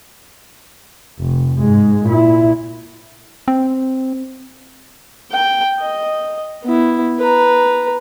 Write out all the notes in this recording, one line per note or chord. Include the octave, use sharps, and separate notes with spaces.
F1
G#2 G#3
A#2 E4
C4
G5
D#5
B3 E4
B4 A#5